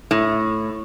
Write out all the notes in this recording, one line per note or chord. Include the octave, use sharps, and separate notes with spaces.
A2